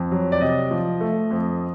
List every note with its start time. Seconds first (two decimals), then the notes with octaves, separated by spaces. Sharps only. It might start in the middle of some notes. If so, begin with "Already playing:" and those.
Already playing: F2
0.12 F#3
0.32 D5
0.41 C3 D#5
0.71 F3
1.01 A3
1.31 F2